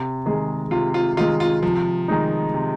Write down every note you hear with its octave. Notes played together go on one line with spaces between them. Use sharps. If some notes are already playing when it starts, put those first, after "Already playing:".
Already playing: C3
D#3 G#3 G#4
C3 F4
F4
D#3 G#3 F4
F4
C3 F3
D#3 G#3 D#4
C3